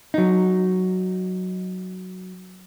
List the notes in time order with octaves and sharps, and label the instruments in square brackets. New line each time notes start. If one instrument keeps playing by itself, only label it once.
[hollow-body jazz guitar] F#3 D#4